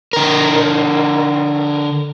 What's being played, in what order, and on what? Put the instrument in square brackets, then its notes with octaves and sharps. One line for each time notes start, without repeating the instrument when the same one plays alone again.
[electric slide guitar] D3 A#4